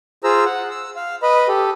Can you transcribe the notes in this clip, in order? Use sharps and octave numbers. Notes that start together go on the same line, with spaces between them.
F4 G#4 C5 A#5 E6
F#5
E6
F5
B4 D#5 B5
G4 A4